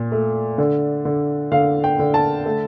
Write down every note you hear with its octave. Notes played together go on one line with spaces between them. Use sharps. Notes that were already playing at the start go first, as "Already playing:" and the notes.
Already playing: A#2
A3
D3
D3
D3 F5
G5
D3
A5
A3